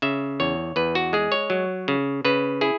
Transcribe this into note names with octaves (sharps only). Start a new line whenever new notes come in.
C#3 E5
E2 C#5
E2 B4
F#4
G#3 G#4
C#5
F#3
C#3
C#3 B4
E4 G#4